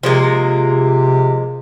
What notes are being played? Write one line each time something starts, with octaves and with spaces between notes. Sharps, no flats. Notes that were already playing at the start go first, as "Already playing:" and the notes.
C3 F3 G#3 A#3